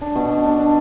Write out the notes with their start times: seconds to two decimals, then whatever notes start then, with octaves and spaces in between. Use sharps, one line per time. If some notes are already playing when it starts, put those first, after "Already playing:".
0.01 D4
0.15 B2
0.30 D4
0.45 D4
0.59 D4